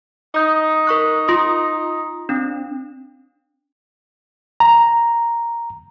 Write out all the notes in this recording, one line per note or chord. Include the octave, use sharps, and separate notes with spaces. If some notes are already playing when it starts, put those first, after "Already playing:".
D#4 D#6 G6
A#4 C#6 F#6
F4 C6 D#6
C4 D4
A#5